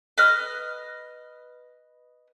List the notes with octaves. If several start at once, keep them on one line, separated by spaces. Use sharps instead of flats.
B4 D#5 F6